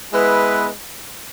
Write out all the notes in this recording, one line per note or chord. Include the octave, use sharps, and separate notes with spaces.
G#3 B3 E4 B4